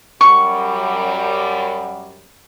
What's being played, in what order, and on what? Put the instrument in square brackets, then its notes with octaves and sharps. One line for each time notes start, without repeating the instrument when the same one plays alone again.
[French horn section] F#2 G3 [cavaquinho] C#6